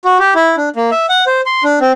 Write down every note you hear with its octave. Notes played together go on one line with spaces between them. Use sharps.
F#4
G4
E4
D4
A#3
E5
F#5
C5
C6
D4
C4